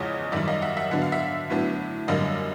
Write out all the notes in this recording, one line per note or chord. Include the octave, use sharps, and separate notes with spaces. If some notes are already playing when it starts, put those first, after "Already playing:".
Already playing: E2 C#3 F3 G#3 C#5 D#5
F#2 D#3 G3 D5 E5
D#5 F5
E5 F#5
E5 F#5
D3 F#3 B3 D4 F#5
F5
E5 F#5
A2 F#3 B3 D4
F#2 D3 G3 A#3 D#5 F5